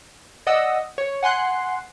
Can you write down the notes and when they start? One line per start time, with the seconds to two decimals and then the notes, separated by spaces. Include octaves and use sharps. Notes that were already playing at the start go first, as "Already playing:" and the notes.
0.47 D5 D#5 F#5 D#6 E6
0.98 C#5
1.23 F#5 G#5 C6 F#6 C7